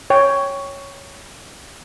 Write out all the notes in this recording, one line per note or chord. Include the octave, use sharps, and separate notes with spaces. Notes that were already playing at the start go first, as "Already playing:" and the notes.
C#5 G5